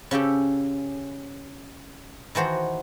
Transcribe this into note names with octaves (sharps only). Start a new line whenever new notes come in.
C#3 C#4 G4 A4
D#3 E3 F#4 C5 A#5